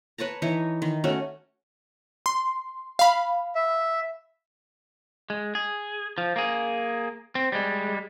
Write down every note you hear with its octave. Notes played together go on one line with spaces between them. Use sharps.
B4 C#5 A5 A#5
E3 D#4 C#5
D#3
A3 C#4 F#4
C6
F5 B5
E5
G#3
G#4
F3
A#3 G#4
C4
G3 G#3